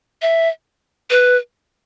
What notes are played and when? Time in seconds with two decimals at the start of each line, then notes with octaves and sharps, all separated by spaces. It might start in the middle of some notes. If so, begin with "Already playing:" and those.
0.22 E5
1.10 B4